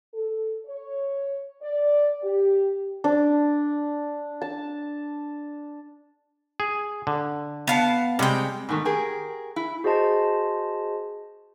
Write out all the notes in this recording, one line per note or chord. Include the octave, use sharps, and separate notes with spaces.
A4
C#5
D5
G4
D4
A5
G#4
D3
B3 F5 A5
C3 G3 G#3 G5
G#2 B2 D#3 A3
G4 G#4 A#4
E4
F#4 G#4 C5 D#5 A5 C6